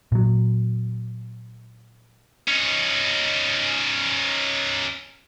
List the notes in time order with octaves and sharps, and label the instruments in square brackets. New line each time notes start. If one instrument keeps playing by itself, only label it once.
[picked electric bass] A#2 F#3
[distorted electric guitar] C#4 D#4